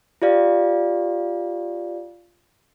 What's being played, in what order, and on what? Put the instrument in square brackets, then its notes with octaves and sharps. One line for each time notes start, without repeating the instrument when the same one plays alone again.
[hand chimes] F4 G4 D5 F5